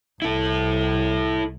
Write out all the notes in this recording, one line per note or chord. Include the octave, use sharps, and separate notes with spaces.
C2 E4 A4